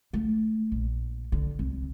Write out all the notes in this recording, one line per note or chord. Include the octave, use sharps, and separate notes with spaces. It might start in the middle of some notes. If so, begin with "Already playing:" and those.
A3
A#1
D3
C2